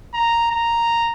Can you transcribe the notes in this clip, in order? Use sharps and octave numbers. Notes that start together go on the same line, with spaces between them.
A#5
A#5